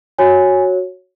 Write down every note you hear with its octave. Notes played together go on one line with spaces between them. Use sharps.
F#4 C#5 G#5